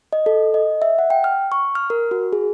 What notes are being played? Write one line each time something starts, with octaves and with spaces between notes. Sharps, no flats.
D#5
A4
D#5
E5
F#5
G5
F6
C#6
F6
A#4
F#4
G#4